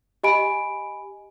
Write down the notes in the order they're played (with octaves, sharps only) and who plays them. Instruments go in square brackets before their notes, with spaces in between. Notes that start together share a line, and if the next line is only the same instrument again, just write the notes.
[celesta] G4 D#5 G#5 B5 D7